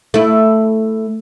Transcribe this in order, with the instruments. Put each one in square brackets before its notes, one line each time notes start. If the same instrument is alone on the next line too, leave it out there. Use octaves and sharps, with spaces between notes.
[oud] A3 E4